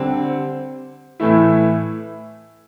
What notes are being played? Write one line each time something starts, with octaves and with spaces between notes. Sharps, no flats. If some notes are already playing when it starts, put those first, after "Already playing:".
Already playing: D3 G3 C4
A2 E3 A3 E4